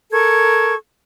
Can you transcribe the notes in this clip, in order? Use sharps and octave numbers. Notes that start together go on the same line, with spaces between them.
A4 A#4 C#6 G#6